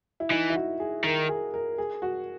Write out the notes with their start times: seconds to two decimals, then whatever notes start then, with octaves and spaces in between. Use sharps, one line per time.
0.20 E4
0.31 E3 D#4
0.50 E4
0.55 F#4
0.80 G#4
1.04 D#3 A#4
1.29 G#4
1.54 A#4
1.78 G#4
2.02 F#4